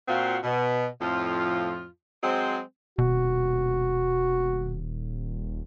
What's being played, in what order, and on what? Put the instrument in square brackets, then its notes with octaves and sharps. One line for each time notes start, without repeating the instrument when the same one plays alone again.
[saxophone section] A#2 C4 F4 F#4
B2
F2 A2 F3 F4
F#3 G#3 C4
[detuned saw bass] D#1 [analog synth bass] B2 [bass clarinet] F#4